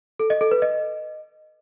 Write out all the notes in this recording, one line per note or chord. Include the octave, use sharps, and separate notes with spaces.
A4
D#5
A4
B4
D#5